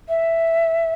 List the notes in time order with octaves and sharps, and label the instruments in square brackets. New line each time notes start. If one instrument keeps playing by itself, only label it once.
[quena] E5